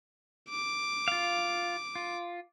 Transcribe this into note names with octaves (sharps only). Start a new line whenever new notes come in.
D6
F4 F5
F4